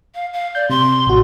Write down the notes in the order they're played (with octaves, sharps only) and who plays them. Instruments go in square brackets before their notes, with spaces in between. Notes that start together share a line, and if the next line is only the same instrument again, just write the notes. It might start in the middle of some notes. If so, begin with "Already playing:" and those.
[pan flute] F5
F5
[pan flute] D5 [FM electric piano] G6
[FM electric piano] C3 [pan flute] C6
[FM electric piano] A1 F#4